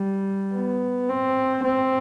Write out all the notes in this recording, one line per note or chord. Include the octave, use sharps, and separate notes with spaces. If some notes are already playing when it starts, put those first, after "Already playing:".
Already playing: G3
B3
C4
C4